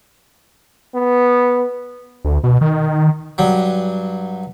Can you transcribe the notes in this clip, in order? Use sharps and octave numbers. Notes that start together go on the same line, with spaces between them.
B3
D2
B2
D#3
G2 F#3